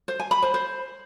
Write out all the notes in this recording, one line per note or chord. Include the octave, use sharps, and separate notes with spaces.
C5
G#5
B5
C5
C5